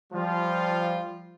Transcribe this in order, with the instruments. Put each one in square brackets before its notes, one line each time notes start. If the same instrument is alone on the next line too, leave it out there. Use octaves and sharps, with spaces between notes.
[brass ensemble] F3 G3 F4